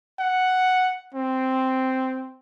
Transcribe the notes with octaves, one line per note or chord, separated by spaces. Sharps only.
F#5
C4